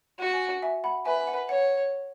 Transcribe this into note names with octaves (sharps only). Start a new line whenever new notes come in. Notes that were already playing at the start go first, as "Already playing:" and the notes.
F#4 F#5
G#5
F#5
E5 G#5
F#5 B5
B4 E5 G#5
G#5
F#5
C#5 F#5